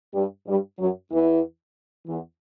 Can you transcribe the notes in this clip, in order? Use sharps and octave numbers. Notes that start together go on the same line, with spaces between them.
G2 G3
G2 G3
F#2 F#3
E2 E3
E2 E3